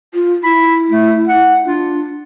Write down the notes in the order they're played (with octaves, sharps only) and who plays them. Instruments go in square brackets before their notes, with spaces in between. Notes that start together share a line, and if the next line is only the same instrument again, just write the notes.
[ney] F4
[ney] E4 [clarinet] B5
[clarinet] A3
F#5
[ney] D4 [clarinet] F4